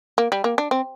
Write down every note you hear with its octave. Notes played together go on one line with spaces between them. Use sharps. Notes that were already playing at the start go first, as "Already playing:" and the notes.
A#3
G3
A#3
D4
C4